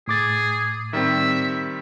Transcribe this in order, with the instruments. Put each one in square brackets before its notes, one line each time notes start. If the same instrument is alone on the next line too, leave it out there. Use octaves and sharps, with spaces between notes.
[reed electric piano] A2 D6 A6 [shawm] G#4
[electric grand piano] D#3 G3 C4 [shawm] E5